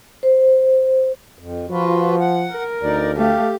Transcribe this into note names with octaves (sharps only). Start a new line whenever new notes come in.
C5
F2
F3 F4 F#4 B4
F#5
A#4
D2 D#4 D5
A3 G4 F5